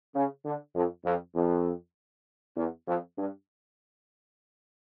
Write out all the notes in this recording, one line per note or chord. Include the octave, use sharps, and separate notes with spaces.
C#3
D3
F2
F2
F2
E2
F2
G2